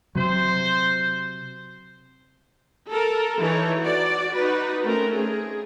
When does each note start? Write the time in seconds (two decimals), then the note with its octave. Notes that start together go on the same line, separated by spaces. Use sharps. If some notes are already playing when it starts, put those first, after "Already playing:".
0.15 C3 F#3 C5
2.89 A4 A#4
3.39 E3 D#4 A4 C#5
3.80 F#4 D5
4.36 D#4 F#4 B4
4.84 A3 C4 C#4 A#4
5.16 G#4